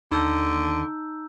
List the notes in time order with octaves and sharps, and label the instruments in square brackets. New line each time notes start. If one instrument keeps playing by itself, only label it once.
[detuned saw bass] D#2 [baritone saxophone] D3 [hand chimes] D#4 [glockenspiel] A#5 E6 G6